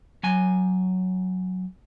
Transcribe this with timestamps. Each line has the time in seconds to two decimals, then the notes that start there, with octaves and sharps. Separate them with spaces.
0.23 F#3 G#5